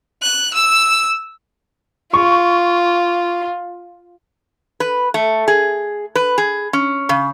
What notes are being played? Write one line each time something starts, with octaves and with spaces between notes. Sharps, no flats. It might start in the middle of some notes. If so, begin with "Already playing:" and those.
F#6
E6
F4 C#6
B4
A3
G#4
B4
G#4
C#4
C#3